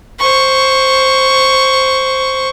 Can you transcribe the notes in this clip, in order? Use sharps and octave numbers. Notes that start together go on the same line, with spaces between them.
C5 C#6